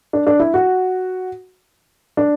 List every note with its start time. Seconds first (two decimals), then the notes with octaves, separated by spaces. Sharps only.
0.13 D4
0.27 D4
0.39 E4
0.54 F#4
2.17 D4